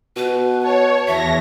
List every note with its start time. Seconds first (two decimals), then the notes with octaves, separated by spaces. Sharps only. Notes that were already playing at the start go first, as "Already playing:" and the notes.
0.16 B2 B4
0.62 C#5 A5
1.07 E2 E5 A#6